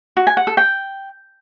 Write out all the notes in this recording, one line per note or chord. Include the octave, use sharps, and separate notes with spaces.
F#4
G#5
F#5
A4
G5